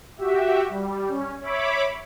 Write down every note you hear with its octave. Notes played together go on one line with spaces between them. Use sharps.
F#4 G4 E5
G3
C#4
C#5 E5 B5 D6